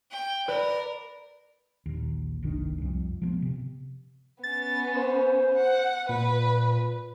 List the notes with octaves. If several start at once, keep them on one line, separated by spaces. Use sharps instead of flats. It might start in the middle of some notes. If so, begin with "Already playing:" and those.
G5
A#4 B4 D5
A#1 D#2
F#1 C2 D#3 D4
C2 F2
F3 F#3 B3
C3
B3 C#4 A6
C5
F#5
A#2 B4